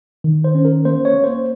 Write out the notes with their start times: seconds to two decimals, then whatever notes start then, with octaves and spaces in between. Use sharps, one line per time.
0.24 D#3
0.44 C5
0.55 C#4
0.65 A#4
0.85 A#3 C5
1.05 C#5
1.14 A#3
1.24 C5